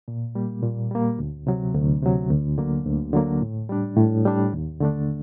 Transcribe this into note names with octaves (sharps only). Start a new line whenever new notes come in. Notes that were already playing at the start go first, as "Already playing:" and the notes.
A#2
G3 A#3
A#2
G3 A#3
D2
C3 F#3
D2
C3 F#3
D2
D3 F#3 A#3
D2
D3 F#3 A#3
A2
G3 D4
A2
G3 D4
D#2
D3 A3 D4